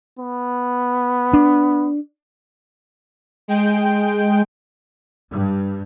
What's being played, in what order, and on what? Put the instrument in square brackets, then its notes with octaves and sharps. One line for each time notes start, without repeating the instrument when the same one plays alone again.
[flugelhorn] B3
[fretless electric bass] D4
[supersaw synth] G#3 G5
[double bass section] G2